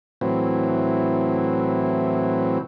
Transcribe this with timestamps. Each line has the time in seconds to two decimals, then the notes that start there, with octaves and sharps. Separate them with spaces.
0.21 A2 E3 F#3 C4